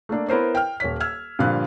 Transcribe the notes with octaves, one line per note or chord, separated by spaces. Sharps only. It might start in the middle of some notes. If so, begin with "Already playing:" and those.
A3 A#3 D4 D5
B3 E4 A#4 C5 C#5
G5 F6
D#1 C#5 B6
E6 F6 G#6
G2 A#2 D3 F3 F5 F#6